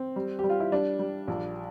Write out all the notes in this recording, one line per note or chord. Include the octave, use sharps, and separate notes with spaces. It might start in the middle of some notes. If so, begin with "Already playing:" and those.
Already playing: C4
G3
G3 G4
F4
E4
G3 D4
G3
A#1